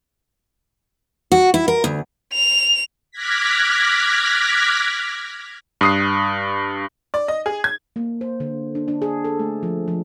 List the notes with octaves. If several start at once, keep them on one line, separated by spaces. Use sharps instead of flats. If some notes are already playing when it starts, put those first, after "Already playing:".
F#4
E4
A#4
D2
F7
D6 F6 F#6 G#6 A#6 B6
G2 D#6 C7
D5
D#5
G#4
G#6
A#3
C5
D3
D4
D4
G#4
A4
A3
F3
F3